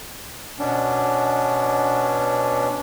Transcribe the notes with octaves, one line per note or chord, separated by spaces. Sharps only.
B2 B3 C#4 D4